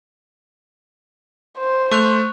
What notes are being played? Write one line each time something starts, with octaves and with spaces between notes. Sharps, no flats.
C5
A3 C#6 F#6 F7